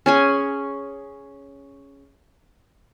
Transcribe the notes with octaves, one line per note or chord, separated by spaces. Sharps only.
C#4 G#4 G#5